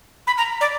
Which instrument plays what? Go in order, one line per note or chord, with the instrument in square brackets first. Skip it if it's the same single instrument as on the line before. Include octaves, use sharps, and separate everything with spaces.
[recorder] B5
A#5
D5